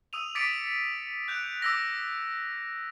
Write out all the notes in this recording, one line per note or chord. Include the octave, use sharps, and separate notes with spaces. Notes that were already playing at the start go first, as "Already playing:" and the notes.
D#6 E6 D#7 F7
D6 A6 B6 C#7 D7
F#6 G6 D7 F7
D6 E6 A#6